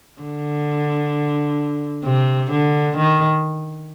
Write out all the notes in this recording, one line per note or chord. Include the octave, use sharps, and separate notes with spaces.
D3
C3
D3
D#3